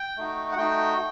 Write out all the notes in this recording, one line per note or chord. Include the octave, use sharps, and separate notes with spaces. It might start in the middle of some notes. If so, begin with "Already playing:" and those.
Already playing: G5
A3 D#4 F#4
F#5
A3 D#4 F#4 G5